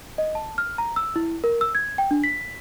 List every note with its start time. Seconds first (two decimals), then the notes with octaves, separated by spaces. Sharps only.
0.18 D#5
0.35 A5
0.58 F6
0.78 A#5
0.96 E6
1.16 E4
1.44 A#4
1.61 E6
1.75 G#6
1.98 G5
2.11 D4
2.24 B6